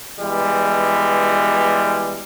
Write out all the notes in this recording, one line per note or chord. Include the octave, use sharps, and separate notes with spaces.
B2 E3 G3 G#3